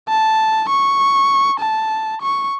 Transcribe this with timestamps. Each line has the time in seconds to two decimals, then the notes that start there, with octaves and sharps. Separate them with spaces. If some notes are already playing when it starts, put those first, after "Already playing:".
0.09 A5
0.69 C#6
1.60 A5
2.22 C#6